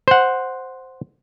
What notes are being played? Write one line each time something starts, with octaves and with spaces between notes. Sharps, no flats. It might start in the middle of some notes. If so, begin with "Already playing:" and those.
C5 F#5